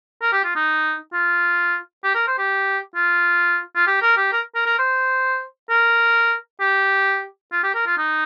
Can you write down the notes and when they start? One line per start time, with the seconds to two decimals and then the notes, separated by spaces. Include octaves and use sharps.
0.21 A#4
0.33 G4
0.44 F4
0.56 D#4
1.13 F4
2.04 G4
2.15 A#4
2.27 C5
2.38 G4
2.95 F4
3.75 F4
3.87 G4
4.02 A#4
4.17 G4
4.32 A#4
4.55 A#4
4.66 A#4
4.78 C5
5.70 A#4
6.60 G4
7.52 F4
7.63 G4
7.74 A#4
7.86 F4
7.98 D#4